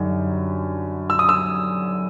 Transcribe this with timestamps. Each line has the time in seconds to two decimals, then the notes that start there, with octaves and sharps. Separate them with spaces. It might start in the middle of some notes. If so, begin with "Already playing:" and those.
Already playing: F#2 D3 G3 D#4
1.10 E6
1.19 D#6
1.29 E6